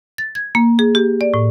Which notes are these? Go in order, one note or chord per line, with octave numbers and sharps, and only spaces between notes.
A6
G#6
A#3
G#4
G4
D5
A2